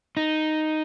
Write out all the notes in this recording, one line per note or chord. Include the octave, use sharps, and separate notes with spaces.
D#4